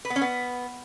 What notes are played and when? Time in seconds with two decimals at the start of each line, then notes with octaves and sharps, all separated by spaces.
0.05 B4
0.10 B3
0.16 C#4
0.21 B3